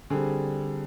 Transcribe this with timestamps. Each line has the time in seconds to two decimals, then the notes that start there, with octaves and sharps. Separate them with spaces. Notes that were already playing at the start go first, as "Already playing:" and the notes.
0.10 D3 G3 C4 G#4